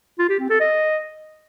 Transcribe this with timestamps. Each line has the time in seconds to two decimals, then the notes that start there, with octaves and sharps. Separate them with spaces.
0.19 F4
0.29 G4
0.40 C4
0.50 A4
0.60 D#5